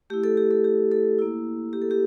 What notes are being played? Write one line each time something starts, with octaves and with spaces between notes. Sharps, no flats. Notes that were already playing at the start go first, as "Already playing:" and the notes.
A3 E4 G4
A4
G4
A4
G4
A4
A#3 E4
G4
A4
G4